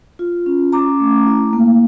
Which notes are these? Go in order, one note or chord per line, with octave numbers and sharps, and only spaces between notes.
F4
C#4
C#4 A#5 D6
A3
E4
A#3